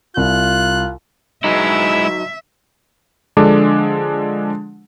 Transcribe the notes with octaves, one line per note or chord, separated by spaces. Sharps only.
C2 F4 F#6
F#3 G#3 D#4 E4 E5
D3 F3 G#3 D4 A4 D6